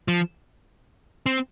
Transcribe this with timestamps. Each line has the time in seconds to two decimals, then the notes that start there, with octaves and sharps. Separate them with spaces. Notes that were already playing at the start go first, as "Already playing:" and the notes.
0.08 F3
1.26 C4